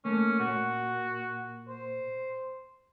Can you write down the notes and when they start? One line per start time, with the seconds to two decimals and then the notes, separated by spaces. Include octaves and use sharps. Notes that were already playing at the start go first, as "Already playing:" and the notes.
0.05 A3 A#3 C#4
0.40 A#2 F#4
1.68 C5